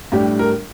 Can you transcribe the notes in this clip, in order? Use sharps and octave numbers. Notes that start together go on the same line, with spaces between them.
A2 G3 D4 G4
A#4